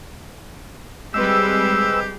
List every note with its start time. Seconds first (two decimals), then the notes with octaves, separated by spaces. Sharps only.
1.14 G3 G#3 C4 G4 G#4 B4 E6